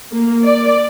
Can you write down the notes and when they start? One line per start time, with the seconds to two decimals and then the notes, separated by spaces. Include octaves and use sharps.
0.12 A#3
0.44 D5